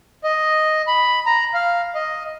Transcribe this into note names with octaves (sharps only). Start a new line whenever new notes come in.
D#5
B5
A#5
F5
D#5